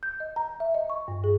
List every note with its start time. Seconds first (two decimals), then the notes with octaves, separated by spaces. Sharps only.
0.03 G6
0.20 D#5
0.36 A#5
0.60 E5
0.74 D#5
0.90 C#6
1.08 G2
1.24 G#4